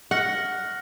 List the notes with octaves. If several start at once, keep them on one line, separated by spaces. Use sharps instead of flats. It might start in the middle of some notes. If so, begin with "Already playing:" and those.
F#5 C#6 F6 A#6